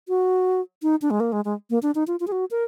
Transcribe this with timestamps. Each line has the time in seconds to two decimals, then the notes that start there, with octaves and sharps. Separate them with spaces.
0.09 F#4
0.82 D#4
1.02 D4
1.11 G#3
1.20 A#3
1.32 G#3
1.45 G#3
1.70 A#3
1.83 D4
1.95 D#4
2.07 F4
2.20 F4
2.27 G#4
2.32 F#4
2.51 A#4